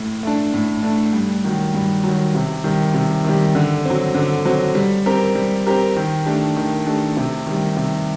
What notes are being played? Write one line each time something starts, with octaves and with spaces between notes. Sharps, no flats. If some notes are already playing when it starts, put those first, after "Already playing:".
Already playing: A2
A3 D4
A2
A3 D4
G2
D#3 F#3
G2
D#3 F#3
C3
D#3 G3
C3
D#3 G3
D3
F#3 C4
D3
F#3 C4
G3
C4 G4 A#4
G3
C4 G4 A#4
D#3
A3 D4 G4
D#3
A3 D4 G4
C3
D#3 G3
C3